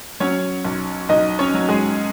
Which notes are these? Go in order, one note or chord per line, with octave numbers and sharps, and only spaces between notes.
F#3 C#4 C#5
B1
B1 D#4 D#5
C#4 C#5
F#3
G#3 G#4